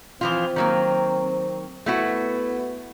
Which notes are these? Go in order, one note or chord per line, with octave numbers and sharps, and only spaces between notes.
E3 F3 C4 F4
D#3 F#3 A#3
A3 B3 E4 F#4